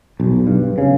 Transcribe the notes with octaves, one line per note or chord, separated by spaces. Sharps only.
B1
G2
C#3